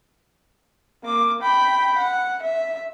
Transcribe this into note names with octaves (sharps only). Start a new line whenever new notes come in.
A#3 D6
G5 B5
F#5
E5